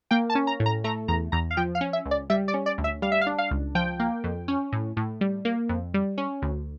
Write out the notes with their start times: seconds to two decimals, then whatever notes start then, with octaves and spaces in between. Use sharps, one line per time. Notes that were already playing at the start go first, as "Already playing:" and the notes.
0.11 A#3 G5
0.30 A5
0.35 C#4
0.47 A#5
0.60 A2
0.66 A#5
0.84 A3 A#5
1.08 E2 A#5
1.32 E2 A#5
1.51 F5
1.57 F3 G5
1.75 F5
1.81 C#4
1.93 E5
2.06 C#2
2.11 D5
2.30 G3 E5
2.48 D5
2.54 C#4
2.66 D5
2.78 D2
2.84 E5
3.02 G3 F5
3.12 E5
3.21 F5
3.27 D4
3.38 F5
3.51 C#2
3.75 F3 G5
4.00 A#3
4.24 F2
4.48 C#4
4.73 A2
4.97 A2
5.21 G3
5.45 A#3
5.69 F2
5.94 G3
6.18 C#4
6.42 D2